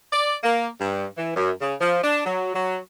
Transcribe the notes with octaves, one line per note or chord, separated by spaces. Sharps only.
D5
A#3
G2
E3
F#2
C#3
F3
D4
F#3
F#3